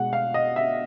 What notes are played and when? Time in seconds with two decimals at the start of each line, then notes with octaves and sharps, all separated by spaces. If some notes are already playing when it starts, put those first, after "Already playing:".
Already playing: B2 G#3 F#5
0.13 F5
0.34 D#5
0.56 E5